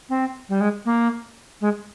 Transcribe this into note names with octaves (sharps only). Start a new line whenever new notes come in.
C4
G3
G#3
A#3
G#3